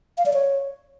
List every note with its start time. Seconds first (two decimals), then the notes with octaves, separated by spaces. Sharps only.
0.18 F5
0.26 D5
0.34 C#5